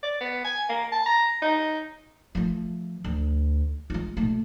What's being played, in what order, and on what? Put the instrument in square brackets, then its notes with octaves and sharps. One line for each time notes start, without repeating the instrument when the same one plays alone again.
[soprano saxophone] D5
B3
G#5
A#3
A5
A#5
D#4
[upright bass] F3 A3
D2
G#3 F4
A#2 A3